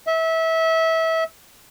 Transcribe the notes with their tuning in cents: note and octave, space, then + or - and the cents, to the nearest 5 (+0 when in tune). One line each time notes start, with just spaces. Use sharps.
E5 -25